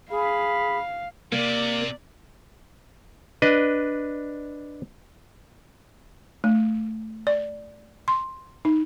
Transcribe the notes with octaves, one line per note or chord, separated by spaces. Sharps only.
G#4 F5 B5
C3 A#3 D5
D4 B4 D#5
A3
D5
C6
D#4